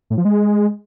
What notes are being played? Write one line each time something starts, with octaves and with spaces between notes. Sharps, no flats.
A2
F3
G#3